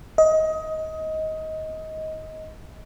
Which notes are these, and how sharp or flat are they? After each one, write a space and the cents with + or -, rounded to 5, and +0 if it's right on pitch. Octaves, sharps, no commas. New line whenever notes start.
D#5 +20